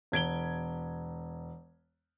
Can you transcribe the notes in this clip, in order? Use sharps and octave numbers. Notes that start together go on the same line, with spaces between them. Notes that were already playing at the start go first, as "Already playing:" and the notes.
E1 G#6 D7 G7